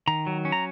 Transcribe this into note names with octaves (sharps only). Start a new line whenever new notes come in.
D#3 A#5
F#3
C#4
A#5